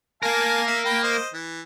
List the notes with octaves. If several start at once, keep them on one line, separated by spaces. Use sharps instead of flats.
A#3 A#4 F5 G#5 A5
E5
G5 B5
C5 D#5
E3